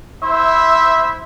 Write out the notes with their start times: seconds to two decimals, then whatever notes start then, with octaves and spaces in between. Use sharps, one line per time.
0.22 E4 C5 E5